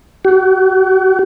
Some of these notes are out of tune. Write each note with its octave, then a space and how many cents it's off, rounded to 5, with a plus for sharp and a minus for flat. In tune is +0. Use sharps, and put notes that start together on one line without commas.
F#4 +45